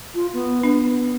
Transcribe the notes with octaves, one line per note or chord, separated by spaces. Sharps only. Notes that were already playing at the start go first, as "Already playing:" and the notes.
F4
B3
B3 D4